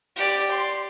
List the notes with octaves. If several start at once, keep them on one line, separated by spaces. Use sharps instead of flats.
G4 D5
C6